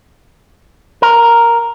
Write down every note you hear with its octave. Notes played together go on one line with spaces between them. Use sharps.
A#4